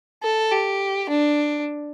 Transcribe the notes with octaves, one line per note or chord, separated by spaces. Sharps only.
A4
G4
D4